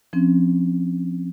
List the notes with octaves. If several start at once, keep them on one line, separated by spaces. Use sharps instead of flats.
F3 C4 C#4